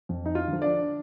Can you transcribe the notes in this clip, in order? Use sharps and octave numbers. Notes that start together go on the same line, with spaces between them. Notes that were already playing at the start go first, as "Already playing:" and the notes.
F2
D#4
F4
D3 F3
D4 D5